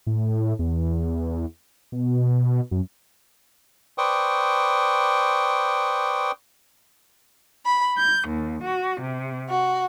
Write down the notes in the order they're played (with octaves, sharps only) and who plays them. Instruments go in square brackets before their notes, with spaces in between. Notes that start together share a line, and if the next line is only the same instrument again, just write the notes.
[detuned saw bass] A2
E2
B2
F#2
[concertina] B4 C5 D5 G5 C#6 D#6
[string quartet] B5
G6
D#2
F#4
C3
F#4